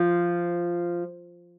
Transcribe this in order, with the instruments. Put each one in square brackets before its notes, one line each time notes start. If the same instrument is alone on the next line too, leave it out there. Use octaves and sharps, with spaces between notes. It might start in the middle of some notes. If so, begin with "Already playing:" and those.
Already playing: [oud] F3